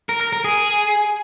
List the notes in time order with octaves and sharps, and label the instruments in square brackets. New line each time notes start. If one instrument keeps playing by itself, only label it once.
[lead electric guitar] A#4
A#4
A#4
G#4